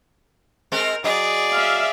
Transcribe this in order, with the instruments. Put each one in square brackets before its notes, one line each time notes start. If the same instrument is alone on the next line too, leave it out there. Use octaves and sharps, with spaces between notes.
[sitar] G#3 C4 [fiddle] A#4
[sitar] F#3 D#5 [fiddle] G#4 D5
[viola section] E5 F5